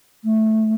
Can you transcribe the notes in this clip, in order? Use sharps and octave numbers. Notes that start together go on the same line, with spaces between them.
A3